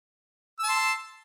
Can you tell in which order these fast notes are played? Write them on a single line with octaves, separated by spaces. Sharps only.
E6 A5 C6